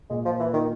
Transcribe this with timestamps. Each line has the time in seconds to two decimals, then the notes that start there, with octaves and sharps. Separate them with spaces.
0.10 A#2 G#3
0.25 F3
0.40 E3
0.53 D#3